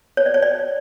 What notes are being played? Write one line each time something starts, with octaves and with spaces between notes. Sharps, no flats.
C#5
D5
C#5
D5